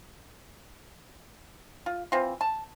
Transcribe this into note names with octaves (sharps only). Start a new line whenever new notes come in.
F4
E3 C4 F4
A5